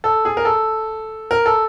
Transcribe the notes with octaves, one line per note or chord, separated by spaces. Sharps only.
A4
G#4
A#4
A4
A#4
A4